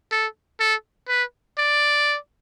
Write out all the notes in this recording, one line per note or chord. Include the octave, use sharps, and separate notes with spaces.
A4
A4
B4
D5